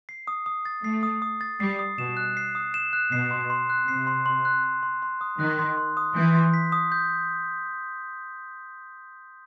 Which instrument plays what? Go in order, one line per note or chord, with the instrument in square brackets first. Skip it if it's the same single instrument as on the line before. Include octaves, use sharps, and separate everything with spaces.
[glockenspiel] C7
D#6
D#6
A6
[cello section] A3 [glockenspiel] C7
[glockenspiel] D#6
D#6
A6
[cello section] G3 [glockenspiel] C7
[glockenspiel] D#6
[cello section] B2 [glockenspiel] E7
[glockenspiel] F#6
C7
D#6
E7
F#6
[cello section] B2 [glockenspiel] C7
[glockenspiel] C6
C6
F#6
[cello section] C3 [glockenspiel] C7
[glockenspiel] C6
C6
F#6
F#6
C6
C6
D#6
[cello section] D#3 [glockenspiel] F#6
[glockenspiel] C6
C6
D#6
[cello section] E3 [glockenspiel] G6
[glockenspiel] C6
B6
D#6
G6